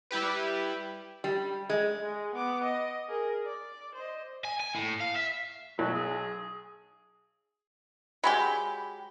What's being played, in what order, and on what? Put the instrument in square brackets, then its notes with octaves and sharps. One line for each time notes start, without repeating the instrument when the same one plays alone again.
[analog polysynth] G3 E4 G4 B4
[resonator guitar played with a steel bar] G3
G#3
[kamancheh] G#3
B3 D6
D#5
G#4 A#4
D5
C5 D#5
[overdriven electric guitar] G#5
G#5
A2
F5
E5
[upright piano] B1 [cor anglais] F#3
[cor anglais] G#4
[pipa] F#3 G#3 G4 [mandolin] B5